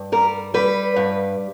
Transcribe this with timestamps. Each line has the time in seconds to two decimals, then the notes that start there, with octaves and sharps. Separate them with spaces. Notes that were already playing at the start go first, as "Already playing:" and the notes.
Already playing: G2
0.12 G3 A#4
0.54 G3 B4
0.96 G2